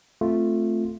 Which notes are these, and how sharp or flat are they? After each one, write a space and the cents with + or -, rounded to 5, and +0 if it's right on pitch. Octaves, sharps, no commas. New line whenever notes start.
A3 +0 C4 +0 F4 +0